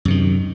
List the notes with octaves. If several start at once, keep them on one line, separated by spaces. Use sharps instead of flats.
F#2 C3 D#3